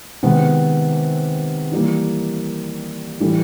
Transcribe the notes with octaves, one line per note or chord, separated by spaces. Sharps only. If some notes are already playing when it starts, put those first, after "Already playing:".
C3 D#3 G#3 B3
E3 G3 A#3
A2 E3 G3